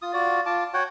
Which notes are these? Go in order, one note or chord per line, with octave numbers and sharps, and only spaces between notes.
F4 D#6
F4 F#4 D5
F4 A5 D6
F#4 C#5 F#5 G5